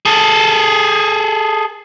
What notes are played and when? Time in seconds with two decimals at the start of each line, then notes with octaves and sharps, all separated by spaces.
0.06 G#4 A4